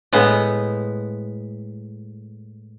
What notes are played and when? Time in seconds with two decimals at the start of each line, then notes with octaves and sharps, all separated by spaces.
0.13 A2 G#3 B3